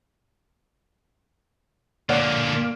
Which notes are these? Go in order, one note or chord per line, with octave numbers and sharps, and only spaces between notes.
A#2 D3 A#3 C#5 D5 F#5